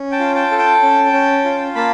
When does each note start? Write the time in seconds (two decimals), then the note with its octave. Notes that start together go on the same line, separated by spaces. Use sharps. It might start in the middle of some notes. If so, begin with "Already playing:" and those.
Already playing: C#4
0.11 G5 A5
0.20 F4
0.35 G5 A5
0.51 A4
0.58 G5 A5
0.82 C#4
1.13 C#4
1.45 F4
1.75 A#3 A5 B5